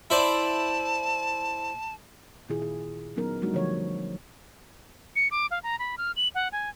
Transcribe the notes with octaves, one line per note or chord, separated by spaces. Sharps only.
E4 C5 D5 A5
A#2 D#3 E4 F4 G#4
G#4
F#3 B3 C#4 D#4 A#4
F3 G3 A3 D4 D#4 F#4
D3 F3 F#3 C#5
C#7
D6
F5
A#5
B5
F6
F#7
F#5
G#5